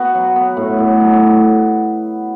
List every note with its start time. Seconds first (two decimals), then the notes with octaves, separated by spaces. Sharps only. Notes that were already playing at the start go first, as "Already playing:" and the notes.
Already playing: B3 F#4
0.15 F#3
0.36 B3
0.57 A2
0.79 A2
1.00 F#3